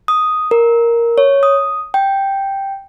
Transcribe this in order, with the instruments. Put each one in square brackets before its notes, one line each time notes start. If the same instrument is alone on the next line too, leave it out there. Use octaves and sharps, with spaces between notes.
[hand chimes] D#6
A#4
C#5
D#6
G5